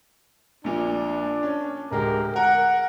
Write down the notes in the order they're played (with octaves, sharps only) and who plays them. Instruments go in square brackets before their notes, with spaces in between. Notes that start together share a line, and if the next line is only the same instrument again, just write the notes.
[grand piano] A#1 A#2 [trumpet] D4
[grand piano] C#4
[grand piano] D1 G#3 G4 [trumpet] A#4
[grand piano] A#4 [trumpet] F#5